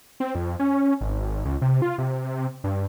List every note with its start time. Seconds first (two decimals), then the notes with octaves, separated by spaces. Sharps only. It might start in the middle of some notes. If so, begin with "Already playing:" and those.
0.20 C4
0.35 F2
0.59 C#4
1.01 G#1
1.45 C#2
1.62 C3
1.82 F4
1.98 C3
2.64 G2